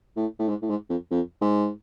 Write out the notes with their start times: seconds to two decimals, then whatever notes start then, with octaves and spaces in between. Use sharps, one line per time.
0.16 A2
0.39 A2
0.48 G#2
0.62 A2
0.69 G#2
0.90 F2
1.11 F2
1.41 G#2